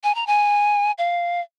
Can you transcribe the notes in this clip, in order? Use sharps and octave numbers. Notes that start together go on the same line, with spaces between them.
G#5
A#5
G#5
F5